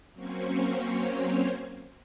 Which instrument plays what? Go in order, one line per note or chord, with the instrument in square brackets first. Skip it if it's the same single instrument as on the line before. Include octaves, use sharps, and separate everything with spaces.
[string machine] F#3 A#3 C4 C#4 C5 C#5